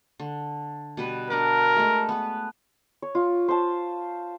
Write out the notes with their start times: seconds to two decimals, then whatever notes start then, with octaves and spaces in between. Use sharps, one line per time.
0.20 D3
0.97 B2 G3 B4
1.30 D4 A#4 F#5 D6
1.76 G#3 A3
2.09 B3 B4
3.02 C#5
3.15 F4
3.48 C5 A5